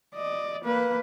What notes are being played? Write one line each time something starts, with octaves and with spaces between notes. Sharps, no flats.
D5 D#5
A#3 B4